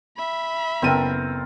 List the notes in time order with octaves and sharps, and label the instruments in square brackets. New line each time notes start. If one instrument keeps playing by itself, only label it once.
[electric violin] E5 B5
[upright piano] F#1 B3 D#7 [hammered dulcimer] C4 A4 A#4